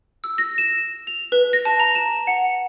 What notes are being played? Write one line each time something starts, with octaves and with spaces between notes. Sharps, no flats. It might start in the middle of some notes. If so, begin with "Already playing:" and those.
E6
A#6
E7
F7
B4
A#6
A5
A#5
E7
F#5